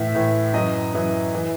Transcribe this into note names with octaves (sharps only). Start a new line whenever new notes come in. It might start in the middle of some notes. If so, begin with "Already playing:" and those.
Already playing: A2 E3 E5
A2 E3
F#2 E3 D#5
F#2 E3
E3